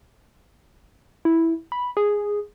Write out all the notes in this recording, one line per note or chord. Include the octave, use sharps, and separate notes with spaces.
E4
B5
G#4